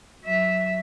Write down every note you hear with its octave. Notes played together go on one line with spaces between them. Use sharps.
F#3 E5